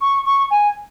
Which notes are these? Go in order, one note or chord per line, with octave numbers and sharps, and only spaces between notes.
C#6
C#6
G#5